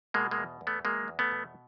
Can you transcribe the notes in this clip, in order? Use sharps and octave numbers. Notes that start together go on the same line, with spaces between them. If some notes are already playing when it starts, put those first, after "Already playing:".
B2 G#3 A#3
G#3 A#3
E2
E2
A3 B3
F#3 G#3 A#3
E2
A3 B3
B2